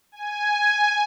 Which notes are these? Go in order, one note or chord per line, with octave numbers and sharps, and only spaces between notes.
G#5